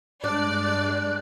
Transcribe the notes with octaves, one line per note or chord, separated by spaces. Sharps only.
G2 G#3 D4 D5 F#6